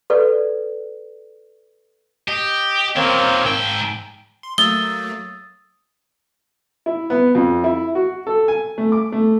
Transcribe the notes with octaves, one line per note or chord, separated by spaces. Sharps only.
A4 B4 D5
G4 D#5
A#2 D#3 A#3 C4 C#5
G#2 G5 E6
C6
F#3 A3 A#3 D#6 E6 A6 G7
E4
B3
F2
E4
F#4
A4
G#5
A3
D6
A3